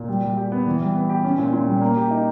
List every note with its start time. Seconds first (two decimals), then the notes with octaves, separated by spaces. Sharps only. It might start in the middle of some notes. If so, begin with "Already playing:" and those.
Already playing: A#2
0.09 G3
0.23 G3
0.37 G4
0.52 B3
0.66 E3
0.81 G3
0.95 B3
1.09 G4
1.24 C#4
1.38 A#2
1.53 A#2
1.67 G3
1.81 A#3
1.97 G4
2.11 D#4